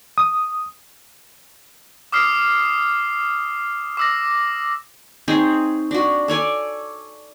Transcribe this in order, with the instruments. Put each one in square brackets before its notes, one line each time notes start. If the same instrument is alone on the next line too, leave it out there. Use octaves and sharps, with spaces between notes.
[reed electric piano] D#6
[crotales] D6 D#6 F6 C7
D6 E6 A#6
[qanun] C4 D#4 G#4 C#5
D4 F#4
A4 C#5 D5 G#5